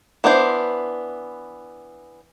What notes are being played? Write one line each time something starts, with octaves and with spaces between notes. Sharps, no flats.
E3 B3 D4 C5